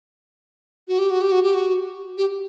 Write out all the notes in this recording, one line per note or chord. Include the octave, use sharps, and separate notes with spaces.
F#4
G4
F#4
G4
F#4
G4
F#4
G4